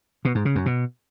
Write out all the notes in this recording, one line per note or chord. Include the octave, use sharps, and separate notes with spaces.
B2
G#2
C#3
F#2
B2